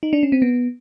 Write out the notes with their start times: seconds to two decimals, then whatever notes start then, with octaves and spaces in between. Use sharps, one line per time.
0.03 D#4
0.13 D4
0.23 C#4
0.32 C4
0.42 B3